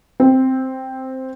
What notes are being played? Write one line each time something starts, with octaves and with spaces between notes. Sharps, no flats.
C4